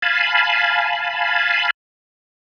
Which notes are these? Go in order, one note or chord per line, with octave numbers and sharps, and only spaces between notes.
F5 G#5 A5 B5